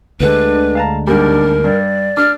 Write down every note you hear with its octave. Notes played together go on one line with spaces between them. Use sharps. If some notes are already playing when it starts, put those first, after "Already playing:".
D2 D3 G#3 D4 B4
F5 A5 A#5
D#2 G#2 G3 D4 A#4
G2 D5
D4 F6